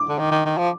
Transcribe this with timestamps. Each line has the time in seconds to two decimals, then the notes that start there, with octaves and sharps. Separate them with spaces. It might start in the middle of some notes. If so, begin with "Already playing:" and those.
Already playing: D6
0.09 D3
0.19 D#3
0.31 D#3
0.46 D#3
0.58 F3